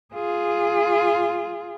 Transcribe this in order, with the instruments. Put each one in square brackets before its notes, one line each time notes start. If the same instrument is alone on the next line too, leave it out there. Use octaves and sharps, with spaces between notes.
[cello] F4 G#4